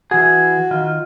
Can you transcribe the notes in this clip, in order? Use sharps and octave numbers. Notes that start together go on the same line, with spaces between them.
E3 F#4 G#4
D#3 F4